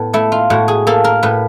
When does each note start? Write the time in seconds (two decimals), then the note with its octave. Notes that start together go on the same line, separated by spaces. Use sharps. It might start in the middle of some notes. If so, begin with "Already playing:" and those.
Already playing: A2 B3
0.13 A3 E4
0.32 F4
0.50 A2 F#4
0.68 G#4
0.87 A#3 A4
1.04 A#4
1.23 A2 B4